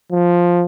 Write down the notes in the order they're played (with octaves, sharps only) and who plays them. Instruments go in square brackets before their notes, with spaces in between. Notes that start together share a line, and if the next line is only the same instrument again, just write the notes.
[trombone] F3